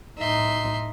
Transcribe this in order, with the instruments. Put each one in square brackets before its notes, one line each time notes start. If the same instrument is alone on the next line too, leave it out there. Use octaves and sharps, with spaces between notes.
[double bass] A2 D#4 [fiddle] E5 C6